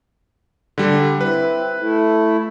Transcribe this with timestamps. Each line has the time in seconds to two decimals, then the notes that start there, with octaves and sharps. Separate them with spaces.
0.78 D3 G3
1.21 C4 E4 B4
1.79 A3 E4